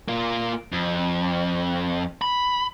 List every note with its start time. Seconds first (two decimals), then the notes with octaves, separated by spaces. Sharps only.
0.08 A#3 F4
0.72 F2
2.22 B5